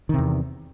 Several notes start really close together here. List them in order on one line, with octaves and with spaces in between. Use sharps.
D#3 C3 E2